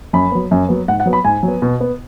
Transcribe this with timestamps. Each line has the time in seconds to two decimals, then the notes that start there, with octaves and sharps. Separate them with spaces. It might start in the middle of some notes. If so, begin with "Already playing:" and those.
0.13 F#2 B5
0.32 F#3 B3
0.51 F#2
0.69 F#3 B3
0.88 G#2 F#5
1.00 F#5
1.06 F#3 B3
1.13 B5
1.25 G#2 G#5
1.43 F#3
1.48 B3
1.62 B2
1.81 B3